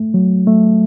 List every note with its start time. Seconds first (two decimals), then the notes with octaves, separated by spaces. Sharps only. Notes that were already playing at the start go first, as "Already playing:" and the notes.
Already playing: A3
0.14 F#3
0.47 A3